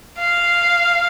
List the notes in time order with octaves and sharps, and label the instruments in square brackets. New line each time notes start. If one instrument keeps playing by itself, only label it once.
[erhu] F5